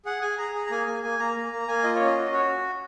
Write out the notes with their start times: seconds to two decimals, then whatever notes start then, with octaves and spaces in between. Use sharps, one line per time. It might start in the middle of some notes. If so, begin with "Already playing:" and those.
0.05 G#4 F#5
0.22 G#4 G#5
0.38 G#4 A#5
0.55 G#4
0.66 A#5
0.71 A#3 G#5
0.87 A#3
1.03 A#3 G#5
1.19 A#3 A#5
1.36 A#3
1.52 A#3
1.68 A#3 G#5
1.84 F4 D#5
1.95 C#5
2.00 C#4
2.06 D#5
2.17 F#4
2.33 F#4 C#5